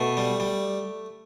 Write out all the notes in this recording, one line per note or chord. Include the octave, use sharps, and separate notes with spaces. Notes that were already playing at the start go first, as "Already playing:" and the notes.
Already playing: B2 A3
G3
G3